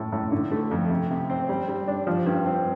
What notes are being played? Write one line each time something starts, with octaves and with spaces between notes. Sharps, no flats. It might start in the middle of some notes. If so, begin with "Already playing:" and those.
Already playing: A2
A2
D3
A3
F2
C3
C3
C4
G3
G3
D4
F3
G2
C4